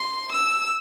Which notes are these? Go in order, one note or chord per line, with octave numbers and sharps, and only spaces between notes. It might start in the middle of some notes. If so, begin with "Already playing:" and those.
Already playing: C6
E6